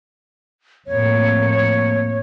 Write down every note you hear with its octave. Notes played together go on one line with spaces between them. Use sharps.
F2 A2 A#3 C#5